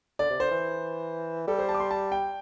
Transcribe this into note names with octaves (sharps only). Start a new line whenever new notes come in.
D3 D5
C3
D3 C5
E3
G3 A4
C5
A5
D6
C6
A5
G5